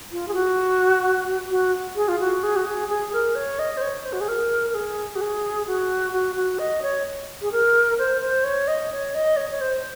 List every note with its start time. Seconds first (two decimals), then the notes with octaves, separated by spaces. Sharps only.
0.12 F4
0.28 G#4
0.34 F#4
1.51 F#4
1.96 G#4
2.08 F4
2.20 F#4
2.43 G#4
2.56 F#4
2.66 G#4
2.89 G#4
3.13 A#4
3.35 C#5
3.59 D#5
3.77 C5
3.82 C#5
4.05 C5
4.13 F#4
4.21 G#4
4.29 A#4
4.70 A#4
4.75 G#4
5.16 F#4
5.21 G#4
5.67 F#4
6.13 F#4
6.36 F#4
6.59 D#5
6.82 C#5
7.42 G#4
7.52 A#4
7.99 C5
8.21 C5
8.44 C#5
8.68 D#5
8.91 C#5
9.14 D#5
9.37 C#5
9.51 C#5
9.61 C5